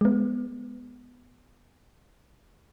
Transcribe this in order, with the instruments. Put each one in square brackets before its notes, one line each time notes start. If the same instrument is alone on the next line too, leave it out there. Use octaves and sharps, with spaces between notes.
[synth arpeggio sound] G#3 B3